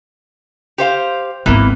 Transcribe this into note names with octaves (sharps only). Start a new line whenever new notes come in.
G4 C5 F5
G#1 E3 A#3 B3